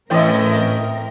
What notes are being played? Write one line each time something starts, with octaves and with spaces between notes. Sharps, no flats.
A2 E3 A3 C4 C#4 A#4 D#5 G5